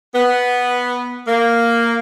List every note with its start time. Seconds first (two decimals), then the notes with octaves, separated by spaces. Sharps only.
0.14 B3
1.27 A#3